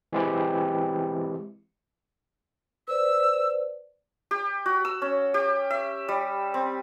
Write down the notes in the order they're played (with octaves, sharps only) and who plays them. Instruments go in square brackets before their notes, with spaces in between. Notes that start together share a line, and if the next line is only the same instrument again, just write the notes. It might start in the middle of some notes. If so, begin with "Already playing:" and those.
[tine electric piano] E3 G#3 C4 E4 G4
[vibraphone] B4 C5 D5 [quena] E6
[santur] G4
F#4
E6
C#4
G4
E5
G3
C4